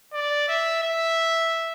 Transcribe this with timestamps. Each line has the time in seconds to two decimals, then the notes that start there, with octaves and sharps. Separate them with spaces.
0.13 D5
0.48 E5
0.83 E5